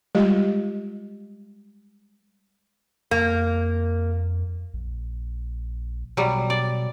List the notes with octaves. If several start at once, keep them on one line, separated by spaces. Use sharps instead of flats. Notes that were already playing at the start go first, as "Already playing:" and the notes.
G3 G#3 F4 G4 D#5
F2 A#3
A#1
B2 F#3 G3
D5